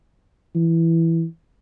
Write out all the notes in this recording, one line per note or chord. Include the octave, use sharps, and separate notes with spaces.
E3